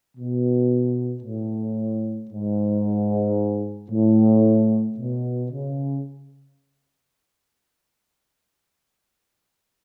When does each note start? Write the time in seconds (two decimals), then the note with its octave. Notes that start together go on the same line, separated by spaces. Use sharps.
0.17 B2
1.23 A2
2.31 G#2
3.91 A2
4.98 B2
5.52 C#3